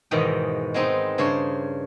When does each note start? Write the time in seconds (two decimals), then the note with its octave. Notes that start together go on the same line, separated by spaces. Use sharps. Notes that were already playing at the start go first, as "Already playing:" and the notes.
0.11 E2 G#2 B2 D#3 D#5 G5
0.74 G#3 B3 C4 D#4
1.18 G2 C#3 C5 C#5